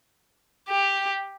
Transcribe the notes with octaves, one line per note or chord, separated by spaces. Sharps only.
G4